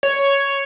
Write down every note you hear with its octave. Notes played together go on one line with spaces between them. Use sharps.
C#5